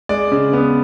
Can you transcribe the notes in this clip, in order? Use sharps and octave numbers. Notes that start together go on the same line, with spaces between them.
G#3 D5
C#3
B3